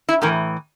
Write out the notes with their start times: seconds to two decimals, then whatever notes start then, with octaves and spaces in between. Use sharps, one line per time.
0.09 E4
0.22 A2 E3 A#4